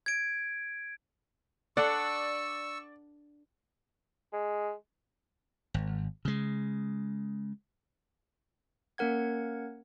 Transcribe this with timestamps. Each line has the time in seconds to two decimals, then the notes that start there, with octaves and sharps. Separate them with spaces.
0.06 G#6 D7
1.77 D4 A4 D5 F#5 C#6 E6
4.33 G#3
5.74 G#1
6.25 C#3 G#3
8.98 A#3 C#4 A#4 F#5 G#6